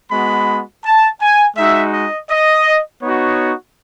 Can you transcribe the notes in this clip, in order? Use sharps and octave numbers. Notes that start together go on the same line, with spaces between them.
G#3 B3 F#4 B5
A5
G#5
G#3 D#4 F#4 E5
D#5
D#5
B3 D#4 F#4 C#5